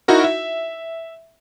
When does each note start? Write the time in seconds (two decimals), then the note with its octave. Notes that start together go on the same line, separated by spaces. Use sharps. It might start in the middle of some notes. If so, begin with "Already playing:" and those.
0.08 D#4 E4 F#4 A#4
0.24 E5